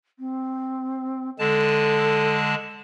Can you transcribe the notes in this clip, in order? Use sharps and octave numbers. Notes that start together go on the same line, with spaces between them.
C4
D3 G#3 A4 A5